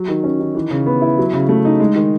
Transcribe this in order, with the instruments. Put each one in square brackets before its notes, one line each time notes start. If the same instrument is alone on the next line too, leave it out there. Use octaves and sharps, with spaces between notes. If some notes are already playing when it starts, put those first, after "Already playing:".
Already playing: [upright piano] F#3
D#3
C#4
D#3
E3
C#3
B3
E4
F#3
C#3
A3
D#4
G#3
D#3